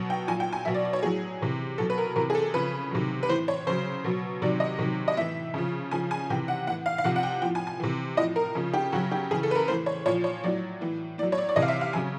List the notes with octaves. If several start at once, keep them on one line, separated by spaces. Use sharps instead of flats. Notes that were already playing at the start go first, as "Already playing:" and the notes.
Already playing: B2 F#3
G5
A#2 F#3 G#5
G5
G#5
B2 F#3 E5
D5
D5
C#5
A2 F#3 G#4
C3 E3
B2 F#3 A4
B4
A#4
C3 E3 A#4
G#4
A4
C#3 F3 B4
C3 D#3 F#3
B4
A2 E3 C5
C#5
C#3 F#3 C5
B2 F#3
C3 D#3 F#3 D5
D#5
C3 D#3 F#3
D#5
A2 E3 E5
C#3 F3
C#3 F3 G#5
G#5
C3 E3 G5
F#5
A2 E3 F#5
F5
F5
C3 F3 F#5
F#5
G5
A2 F3 G5
G#5
G#5
C3 E3
A2 F3 D#5
A#4
C#3 F3
G4
C#3 F#3 F#4
G4
C#3 E3 G#4
A4
B4
A#4
A2 E3 C5
C#5
A#2 F3 C#5
C#5
A2 F#3 D5
A2 E3
A2 F#3 D5
C#5
D5
D5
C3 E3 D#5
F5
E5
F5
C#3 F#3 G#5